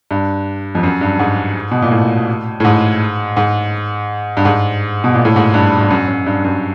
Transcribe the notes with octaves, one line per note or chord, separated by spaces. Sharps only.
G2
F2
F#2
G2
G#2
B2
A#2
A2
A2
G#2
G#2
G2
G#2
B2
A#2
A2
G#2
G2
G2
F#2
F#2
G2
F#2